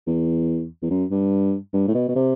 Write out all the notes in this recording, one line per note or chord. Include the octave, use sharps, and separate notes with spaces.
E2
E2
F#2
G2
G2
A2
B2
B2
C3